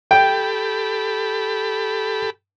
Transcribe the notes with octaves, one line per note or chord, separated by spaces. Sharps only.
G4 A4 G5 B5